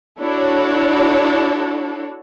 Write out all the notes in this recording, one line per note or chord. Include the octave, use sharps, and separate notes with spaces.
D4 E4 F#4 A4 C#5